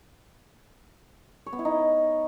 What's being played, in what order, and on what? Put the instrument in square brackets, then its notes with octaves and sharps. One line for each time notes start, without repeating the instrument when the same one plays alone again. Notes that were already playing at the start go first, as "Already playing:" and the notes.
[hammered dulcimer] C#5
B3
E4
D#4